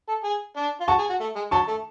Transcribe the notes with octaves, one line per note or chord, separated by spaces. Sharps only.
A4
G#4
D4
F4
F#4 A5 C#6
G#4
F#4
A3
G#3
F#3 A5 C#6
A3